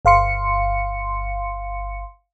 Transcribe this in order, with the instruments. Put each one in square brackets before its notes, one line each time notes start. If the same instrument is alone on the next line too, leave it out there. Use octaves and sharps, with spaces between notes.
[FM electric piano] G1 F5 C6 C#7